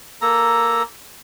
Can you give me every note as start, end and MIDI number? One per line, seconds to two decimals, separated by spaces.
0.21 0.83 58
0.21 0.83 69
0.21 0.83 82